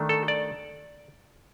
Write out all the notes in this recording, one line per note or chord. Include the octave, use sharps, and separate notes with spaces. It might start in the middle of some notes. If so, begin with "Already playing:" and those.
Already playing: D#3 A3 D4
A4
D5